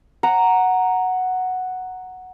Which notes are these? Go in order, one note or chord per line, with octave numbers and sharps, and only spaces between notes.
F#5 A#5